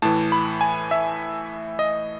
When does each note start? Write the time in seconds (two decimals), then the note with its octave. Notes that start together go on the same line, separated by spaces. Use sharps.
0.02 A2 E3 A5
0.32 B5
0.61 G#5
0.91 E5
1.79 D#5